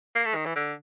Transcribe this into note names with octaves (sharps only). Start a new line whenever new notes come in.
A#3
A3
D#3
E3
D3